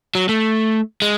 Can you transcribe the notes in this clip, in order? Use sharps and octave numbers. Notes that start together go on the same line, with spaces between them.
F#3
A3
G#3